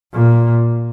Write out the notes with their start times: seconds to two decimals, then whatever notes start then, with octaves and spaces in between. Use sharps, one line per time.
0.13 A#2